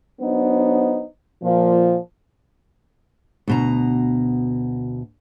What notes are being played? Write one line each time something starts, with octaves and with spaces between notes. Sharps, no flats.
F#3 B3 D4 D#4 C5
A#2 F3
D2 B2 A#5